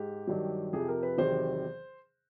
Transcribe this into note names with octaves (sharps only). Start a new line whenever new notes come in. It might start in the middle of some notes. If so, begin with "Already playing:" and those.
Already playing: G#2 G4
G2 D#3 F#3
F2 C3 F3 G#4
A#4
B4
E2 C3 D#3 F#3 C5